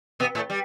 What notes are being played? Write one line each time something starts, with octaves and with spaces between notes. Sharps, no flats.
B2 B3
A2 A3
G3